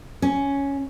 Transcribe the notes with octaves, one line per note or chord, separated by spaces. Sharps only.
C#4